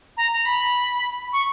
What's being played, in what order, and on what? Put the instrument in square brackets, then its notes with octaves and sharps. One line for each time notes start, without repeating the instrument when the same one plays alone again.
[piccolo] A#5
A#5
B5
C#6